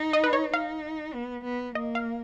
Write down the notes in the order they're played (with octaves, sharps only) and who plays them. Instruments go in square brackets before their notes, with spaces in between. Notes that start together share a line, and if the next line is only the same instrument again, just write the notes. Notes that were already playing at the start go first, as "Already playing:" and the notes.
Already playing: [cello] D#4
[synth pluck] D#5
B4
C#5
[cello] D#4 [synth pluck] F5
[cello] B3
B3
[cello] A#3 [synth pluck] D#5
[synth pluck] F5